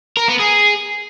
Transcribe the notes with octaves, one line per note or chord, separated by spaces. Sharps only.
A#4
B3
G#4